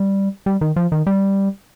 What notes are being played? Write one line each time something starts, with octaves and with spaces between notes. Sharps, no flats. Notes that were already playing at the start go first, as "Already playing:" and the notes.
Already playing: G3
G3
D#3
F3
D#3
G3